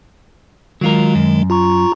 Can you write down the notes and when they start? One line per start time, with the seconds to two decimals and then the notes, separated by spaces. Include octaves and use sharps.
0.81 D#3 F#3 G#3 F4 A#4
1.15 F#2
1.50 F4 A#5 C#6